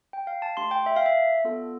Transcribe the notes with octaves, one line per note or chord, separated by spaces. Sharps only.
G5
F5
A5
A3 D4 G4 C6
G5
E5
F5
E5
B3 D4 F4 A4